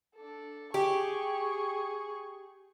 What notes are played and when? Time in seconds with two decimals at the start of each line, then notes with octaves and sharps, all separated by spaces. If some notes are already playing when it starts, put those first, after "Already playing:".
0.16 D4 A4
0.74 G4 G#4 C#6